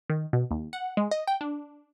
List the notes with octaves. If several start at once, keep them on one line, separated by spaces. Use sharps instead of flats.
D#3
B2
D#2
F#5
G#3
D#5
G5
D4